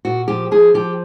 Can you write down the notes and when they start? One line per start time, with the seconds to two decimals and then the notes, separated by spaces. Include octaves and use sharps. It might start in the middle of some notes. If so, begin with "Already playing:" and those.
0.05 A#2 F#4
0.28 F3 G4
0.51 F3 G#4
0.74 F3 G4